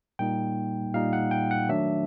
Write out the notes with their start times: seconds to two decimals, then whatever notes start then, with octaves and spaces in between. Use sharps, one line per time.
0.19 A#2 G3 A#3 D#4 G5
0.94 A#2 G3 A#3 D#4 F5
1.13 F#5
1.31 G5
1.51 F#5
1.69 D#3 F#3 A3 D4 E5